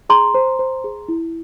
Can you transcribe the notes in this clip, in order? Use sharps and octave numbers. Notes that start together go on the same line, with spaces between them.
G#4 A#5 C6
C5
C5
G#4
E4